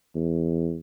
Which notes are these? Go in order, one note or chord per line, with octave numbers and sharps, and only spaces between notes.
E2